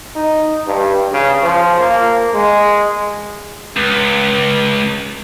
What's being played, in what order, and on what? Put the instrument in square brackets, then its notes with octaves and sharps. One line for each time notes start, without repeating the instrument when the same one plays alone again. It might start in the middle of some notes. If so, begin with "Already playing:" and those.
[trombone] D#4
G2
C#3
F3
A#3
G#3
[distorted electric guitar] C#2